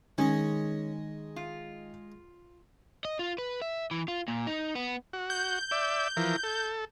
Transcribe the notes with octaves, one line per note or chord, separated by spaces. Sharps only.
D#3 G#3 C#4 D#5
F4
D#5
F4
B4
E5
E3
F4
A#2
D#4
B3
F#4
G6
D5 E5
E3 F3 A#4
A4